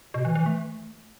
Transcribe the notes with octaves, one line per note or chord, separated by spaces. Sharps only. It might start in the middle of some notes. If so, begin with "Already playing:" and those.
B2
E3
E3
A3